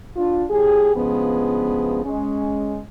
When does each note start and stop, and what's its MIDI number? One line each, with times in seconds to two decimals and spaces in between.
0.16 0.43 62
0.16 0.43 65
0.50 0.93 45
0.50 0.93 67
0.50 0.93 68
0.95 2.02 43
0.95 2.02 49
0.95 2.02 53
0.95 2.02 56
0.95 2.02 59
2.04 2.79 56
2.04 2.79 61